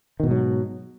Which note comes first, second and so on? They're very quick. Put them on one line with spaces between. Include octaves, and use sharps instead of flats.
D#3 B2 G#2 F#3